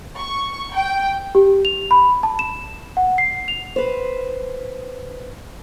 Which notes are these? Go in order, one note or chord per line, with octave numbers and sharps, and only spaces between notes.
C#6
G5
G4
F7
B5
A5
E7
F#5
C7
F7
B4 C5